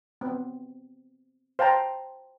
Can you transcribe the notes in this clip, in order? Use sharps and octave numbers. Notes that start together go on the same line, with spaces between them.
B3 C4
C5 F5 G5 A5 A#5